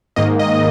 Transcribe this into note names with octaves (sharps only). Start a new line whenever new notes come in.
G#2 D#3 A#3 D#5
D#5